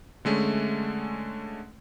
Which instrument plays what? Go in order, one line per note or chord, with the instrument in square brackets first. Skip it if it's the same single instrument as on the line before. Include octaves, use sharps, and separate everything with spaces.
[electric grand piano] D3 G#3 A3 C#4